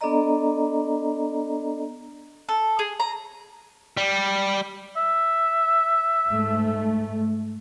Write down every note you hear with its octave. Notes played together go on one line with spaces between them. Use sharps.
B3 D4 A4 D5 D#5 A#5
A4
G#4
A#5
G3
E5
G#2 A3